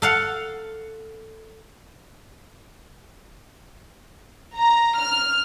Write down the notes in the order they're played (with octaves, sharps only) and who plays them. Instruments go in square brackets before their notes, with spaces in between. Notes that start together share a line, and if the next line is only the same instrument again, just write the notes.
[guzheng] A4 F5 F#5
[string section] A#5
F6